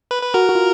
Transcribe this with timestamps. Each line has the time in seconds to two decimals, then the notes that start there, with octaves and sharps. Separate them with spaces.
0.11 B4
0.22 B4
0.34 F#4 A#4
0.49 F#4
0.55 F4